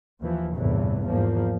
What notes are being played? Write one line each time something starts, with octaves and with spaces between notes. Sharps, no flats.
D#2 E3 F3
G1 E2 A2 C3 E3
E2 G#2 F3 A#3